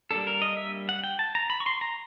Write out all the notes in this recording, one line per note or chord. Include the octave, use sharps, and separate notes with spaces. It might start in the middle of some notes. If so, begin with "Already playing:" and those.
G3 A#3 D4 A4
A#4
D#5
E5
F#5
G5
A5
A#5
B5
C#6
C6
A#5